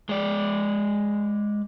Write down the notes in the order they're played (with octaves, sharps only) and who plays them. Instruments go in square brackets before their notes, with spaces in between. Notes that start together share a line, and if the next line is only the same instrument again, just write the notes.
[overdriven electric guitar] G#3 D5